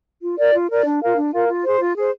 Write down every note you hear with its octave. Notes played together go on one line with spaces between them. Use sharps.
F4
A#4 D5
F4
A#4 D5
D4
F4 A#4 F5
D4
F4 A#4 F5
F4
G#4 C5
F4
G#4 C5